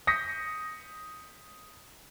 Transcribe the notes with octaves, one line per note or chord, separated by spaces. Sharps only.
D#6 G6 A#6 B6 C#7